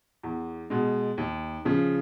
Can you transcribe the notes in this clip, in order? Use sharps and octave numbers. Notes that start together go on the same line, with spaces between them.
E2
B2 G#3
D#2
C#3 F3